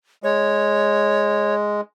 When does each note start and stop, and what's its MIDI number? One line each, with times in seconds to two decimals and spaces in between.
0.23 1.81 56
0.23 1.55 73